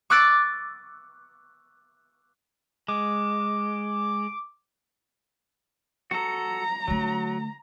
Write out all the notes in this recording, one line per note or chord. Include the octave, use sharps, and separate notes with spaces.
C#6 D6 E6 F#6 A6 D7
G#3 D6
F#4 A4 A#5
D3 F#3 A3